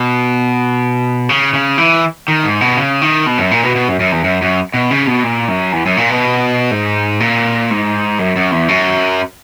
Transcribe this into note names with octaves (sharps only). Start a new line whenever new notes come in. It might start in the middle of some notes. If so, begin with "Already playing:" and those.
Already playing: B2
C#3
C#3
E3
D#3
G#2
B2
C#3
D#3
B2
F#2
A#2
B2
B2
F#2
F#2
E2
F#2
F#2
B2
C#3
B2
A#2
F#2
E2
F#2
A#2
B2
G#2
A#2
G#2
F#2
F#2
E2
F#2